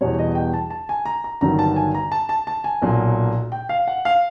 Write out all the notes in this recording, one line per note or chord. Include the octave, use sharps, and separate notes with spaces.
E2 B2 G3 C#5
D#5
G5
A5
A5
G#5
A#5
A#5
G1 G2 D#3 F#3 A#5
A5
G#5
A#5
A5
A5
A5
G#5
B1 A#2 F#3
G5
F5
F#5
F5